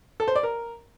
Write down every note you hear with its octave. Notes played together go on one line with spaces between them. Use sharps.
A4
C5
D5
A#4